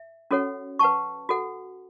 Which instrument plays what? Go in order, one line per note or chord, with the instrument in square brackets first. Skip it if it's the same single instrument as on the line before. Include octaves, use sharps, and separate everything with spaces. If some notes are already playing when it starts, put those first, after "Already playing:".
Already playing: [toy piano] E5
C#4 F#4 A4 C#5 F#5
B4 F#5 A5 C#6
F#4 A4 F#5